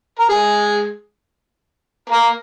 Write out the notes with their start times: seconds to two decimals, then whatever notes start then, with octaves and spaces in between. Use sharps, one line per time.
0.19 A#4
0.29 G#3 G#4
2.10 A#3 A#4